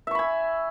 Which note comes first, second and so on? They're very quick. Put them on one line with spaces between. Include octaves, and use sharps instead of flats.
E5 C#6 B5 G#5